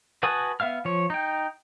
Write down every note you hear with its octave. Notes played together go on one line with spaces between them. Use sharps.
F#4 B4 G#5 A5 D#6
B3 E5 F5 F6
F3 C#5
D#4 G5